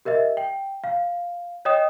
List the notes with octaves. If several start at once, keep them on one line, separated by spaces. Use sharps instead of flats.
G4 A#4 D#5 E5
G5
F5
C#5 D#5 G5 D#6 E7